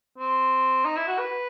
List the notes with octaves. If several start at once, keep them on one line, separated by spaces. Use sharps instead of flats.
C4
D#4
E4
F#4
B4